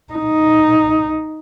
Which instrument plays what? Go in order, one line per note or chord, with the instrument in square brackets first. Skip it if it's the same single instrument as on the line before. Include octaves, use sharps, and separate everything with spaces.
[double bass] D#4